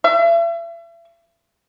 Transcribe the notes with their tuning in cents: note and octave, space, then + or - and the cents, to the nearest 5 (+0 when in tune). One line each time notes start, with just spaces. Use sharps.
E5 +40